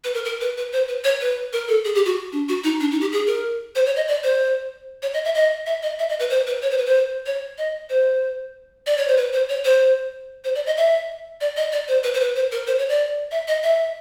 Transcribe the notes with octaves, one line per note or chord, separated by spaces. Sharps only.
B4
A#4
A#4
B4
B4
C5
B4
C#5
B4
A#4
A4
G#4
G4
F#4
D4
F#4
D#4
D4
D#4
G4
G#4
A#4
C5
C#5
D#5
D5
C5
C#5
D#5
E5
D#5
E5
D#5
E5
D#5
B4
C5
B4
C#5
C5
B4
C5
C#5
D#5
C5
D5
C#5
C5
B4
C5
C#5
C5
C5
D5
D#5
E5
D5
D#5
D5
C5
B4
C5
B4
C5
A#4
C5
C#5
D5
E5
D#5
E5